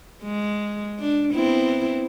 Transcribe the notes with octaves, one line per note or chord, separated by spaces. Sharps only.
G#3
D4
B3 C4 E4